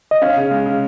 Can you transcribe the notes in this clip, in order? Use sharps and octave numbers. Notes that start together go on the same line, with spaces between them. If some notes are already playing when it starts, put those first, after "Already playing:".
D#5
C#4 F5
C#3
G#3
C#3